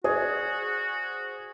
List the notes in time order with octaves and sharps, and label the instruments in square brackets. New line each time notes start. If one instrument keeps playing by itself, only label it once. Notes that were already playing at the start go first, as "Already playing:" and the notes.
[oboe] F#4 [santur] G#4 [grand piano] C5 D5 G#5